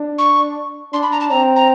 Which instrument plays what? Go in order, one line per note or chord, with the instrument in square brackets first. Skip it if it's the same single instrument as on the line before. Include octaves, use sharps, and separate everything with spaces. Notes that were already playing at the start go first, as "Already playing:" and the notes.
Already playing: [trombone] D4
[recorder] C#6
[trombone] D4 [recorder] C6
[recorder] B5
A#5
A5
[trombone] C4 [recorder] A#5
[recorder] A#5